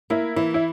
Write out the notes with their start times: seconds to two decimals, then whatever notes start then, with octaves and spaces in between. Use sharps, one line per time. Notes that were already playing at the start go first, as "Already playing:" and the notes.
0.10 A#3 E4
0.36 E3 E4
0.54 E4